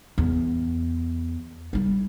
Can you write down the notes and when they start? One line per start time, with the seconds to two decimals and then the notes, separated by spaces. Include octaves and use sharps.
0.18 E2
1.73 G3 E4